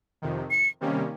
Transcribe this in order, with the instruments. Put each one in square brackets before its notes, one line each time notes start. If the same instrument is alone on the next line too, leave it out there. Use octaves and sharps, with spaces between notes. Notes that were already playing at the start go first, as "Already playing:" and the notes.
[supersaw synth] F2 C3 D#3
[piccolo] C#7
[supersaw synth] C3 D#3 G3 A#3 C#4